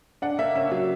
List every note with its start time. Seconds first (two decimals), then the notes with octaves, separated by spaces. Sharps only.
0.22 D4 F#5
0.39 A#3 E5
0.55 C#4 E5
0.72 F#3